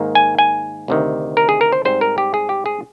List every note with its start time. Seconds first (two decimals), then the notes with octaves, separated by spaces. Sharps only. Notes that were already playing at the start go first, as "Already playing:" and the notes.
Already playing: G#2 D#3 A#3
0.15 G#5
0.38 G#5
0.88 D2 C3 D#3
1.37 A#4
1.49 G#4
1.61 A#4
1.72 C5
1.85 G#2 G3 C4 C5
2.01 A#4
2.18 G4
2.34 G#4
2.49 G4
2.66 G#4